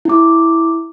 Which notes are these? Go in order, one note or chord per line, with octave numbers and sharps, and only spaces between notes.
E4 D6